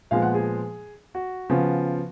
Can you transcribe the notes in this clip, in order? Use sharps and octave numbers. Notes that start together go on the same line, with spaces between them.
A#2 F3 G#3 B3 F5
F#5
G#4
F#4
C#3 F3 B3